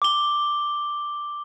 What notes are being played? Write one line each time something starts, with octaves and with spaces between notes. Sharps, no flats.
D6 G7